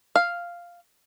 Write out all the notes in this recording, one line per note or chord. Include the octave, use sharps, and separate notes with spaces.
F5